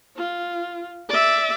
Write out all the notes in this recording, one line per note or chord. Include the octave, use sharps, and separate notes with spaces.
F4
D5 E5